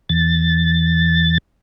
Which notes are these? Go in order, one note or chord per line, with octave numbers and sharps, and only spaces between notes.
E2 A6